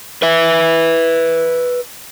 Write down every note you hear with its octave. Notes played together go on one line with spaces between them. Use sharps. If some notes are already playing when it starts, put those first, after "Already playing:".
B4 E5